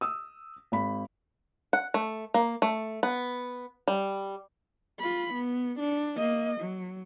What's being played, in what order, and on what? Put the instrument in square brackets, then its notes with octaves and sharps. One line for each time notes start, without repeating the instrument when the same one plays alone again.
[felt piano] D#6 E6
G#1 B5
[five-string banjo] F#5
A3
A#3
A3
B3
G3
[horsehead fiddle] F4 B5
B3
D4
A#3 D#5
F#3